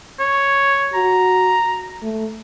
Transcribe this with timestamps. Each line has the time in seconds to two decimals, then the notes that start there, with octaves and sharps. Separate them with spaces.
0.19 C#5
0.94 F#4 A#5
2.03 A3